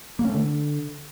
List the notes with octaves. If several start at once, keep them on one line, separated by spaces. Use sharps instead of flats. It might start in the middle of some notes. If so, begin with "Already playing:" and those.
A#3
C#4
A3
D3